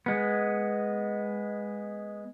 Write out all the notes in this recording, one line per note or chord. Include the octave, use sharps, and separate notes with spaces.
G#3 B3